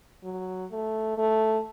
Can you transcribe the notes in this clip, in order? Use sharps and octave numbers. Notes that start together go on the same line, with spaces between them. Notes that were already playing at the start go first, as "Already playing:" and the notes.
F#3
A3
A3